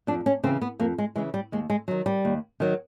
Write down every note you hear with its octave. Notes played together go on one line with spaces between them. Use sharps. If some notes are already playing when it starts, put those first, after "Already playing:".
F2 D4
C#4
C#3 E3 C4
B3
F2 A#3
G#3
C#3 E3 G#3
G3
D#2 G#3
G#3
D#3 F#3
G3
D#2
D#3 F#3